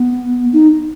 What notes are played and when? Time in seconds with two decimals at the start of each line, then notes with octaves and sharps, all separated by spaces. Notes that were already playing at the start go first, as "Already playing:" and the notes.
Already playing: B3
0.52 D#4